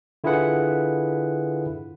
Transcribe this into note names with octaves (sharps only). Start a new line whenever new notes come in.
D3 E4 F4 G#4 B4 F#5